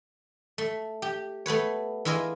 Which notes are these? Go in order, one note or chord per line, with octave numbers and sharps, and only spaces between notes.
A3
G4
A3 B3 B4 C#5
E3 E4 F4 G#4 D#5